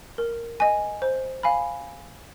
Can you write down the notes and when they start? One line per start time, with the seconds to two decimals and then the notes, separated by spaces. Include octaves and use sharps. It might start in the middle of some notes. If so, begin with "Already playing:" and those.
0.18 A#4
0.60 D#5 G#5
1.02 C5
1.43 F5 G#5 B5